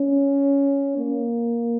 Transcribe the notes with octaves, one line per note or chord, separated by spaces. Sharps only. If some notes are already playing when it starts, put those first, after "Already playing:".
Already playing: C#4
A#3